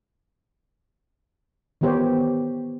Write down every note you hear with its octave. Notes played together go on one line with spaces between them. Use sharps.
D#3 E3 B3 G4 C5 C#5